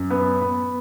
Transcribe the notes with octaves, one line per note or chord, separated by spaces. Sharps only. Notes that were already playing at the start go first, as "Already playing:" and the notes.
Already playing: F#2
B3
B3